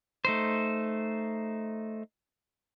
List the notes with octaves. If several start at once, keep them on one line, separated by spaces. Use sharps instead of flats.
A3 D#4 C5